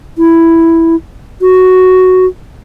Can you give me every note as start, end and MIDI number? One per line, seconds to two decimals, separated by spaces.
0.18 0.96 64
1.41 2.26 66